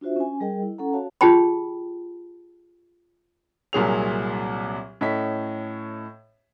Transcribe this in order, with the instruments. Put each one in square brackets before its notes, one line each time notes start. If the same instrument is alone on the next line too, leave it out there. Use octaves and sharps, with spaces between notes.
[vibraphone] D4 F4 F#4 C5 E5
C#4 G#5
G3 G#4 A#4 D#5 G5
E4
C#4 A4 F#5 A#5
F#4 C#5 F5 A5
[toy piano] F4 G4 G#4 G5 A5 B5
[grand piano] C2 A#2 F#3 G#4 C#5 F7
A2 C#4 D#5 B6